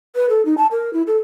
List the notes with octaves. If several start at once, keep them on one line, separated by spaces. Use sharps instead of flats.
B4
A4
D#4
A5
A#4
E4
A4